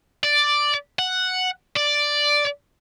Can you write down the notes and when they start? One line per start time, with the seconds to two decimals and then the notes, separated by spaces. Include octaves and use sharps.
0.24 D5
0.99 F#5
1.76 D5